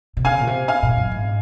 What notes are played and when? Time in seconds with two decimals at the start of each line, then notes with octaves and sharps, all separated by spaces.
0.17 C3
0.25 C#3 F5 G#5
0.40 A#2
0.47 C3
0.68 F5 G#5
0.83 A#2
0.97 F#2
1.11 G#2